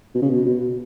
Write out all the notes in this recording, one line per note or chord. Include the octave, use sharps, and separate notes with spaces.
B2
C#3
B2
B2